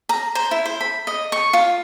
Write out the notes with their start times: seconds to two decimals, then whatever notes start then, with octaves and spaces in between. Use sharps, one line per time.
0.09 A#5
0.35 C5
0.51 E4
0.66 C5
0.81 B5
1.07 D#5
1.32 C#6
1.53 F4